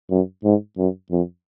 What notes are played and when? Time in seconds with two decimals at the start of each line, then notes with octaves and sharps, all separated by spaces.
0.10 F#2
0.44 G#2
0.78 F#2
1.11 F2